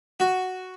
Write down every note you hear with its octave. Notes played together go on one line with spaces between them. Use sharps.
F#4